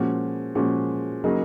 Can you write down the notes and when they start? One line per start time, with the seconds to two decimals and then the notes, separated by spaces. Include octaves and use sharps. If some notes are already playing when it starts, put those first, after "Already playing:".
Already playing: A#2 F3 G#3 C#4 F#4
0.55 A#2 F3 G#3 C#4 F#4
1.24 C#3 F#3 A#3 D#4 G#4